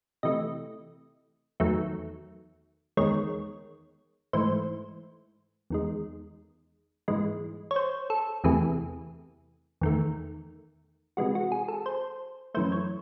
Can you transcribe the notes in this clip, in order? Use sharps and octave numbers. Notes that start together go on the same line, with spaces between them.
C3 E3 A3 D#5
E2 D#3 F#3 A3
E2 D#3 G#3 C#5
G#2 E3 A3 C5
E2 D#3 G#3
G#2 E3 G#3
C#5
C5
A4
E2 C3 E3 A3 G#4
E2 D#3 A3
C3 E3 G#3 F#4
F#4
G#4
A4
C5
F#2 E3 A3 C5
C#5